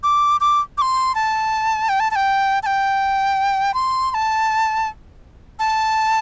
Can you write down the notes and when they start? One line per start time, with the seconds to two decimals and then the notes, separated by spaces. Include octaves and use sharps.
0.03 D6
0.41 D6
0.78 D6
0.81 C6
1.15 A5
1.89 G5
2.00 A5
2.11 A5
2.16 G5
2.63 A5
2.66 G5
3.74 C6
4.11 C6
4.14 A5
5.59 A5